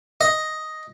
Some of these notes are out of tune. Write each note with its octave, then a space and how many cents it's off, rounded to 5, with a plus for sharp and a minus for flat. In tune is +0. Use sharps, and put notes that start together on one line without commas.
D#5 +5